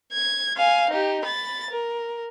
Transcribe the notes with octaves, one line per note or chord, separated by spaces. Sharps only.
G#6
F5 G#5
D#4 G4
B5 A6
A#4